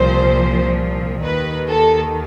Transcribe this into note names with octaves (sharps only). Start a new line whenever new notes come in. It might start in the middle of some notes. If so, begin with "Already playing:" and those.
Already playing: C2 A#2 F3 C5
D#2 D#3 B4
A4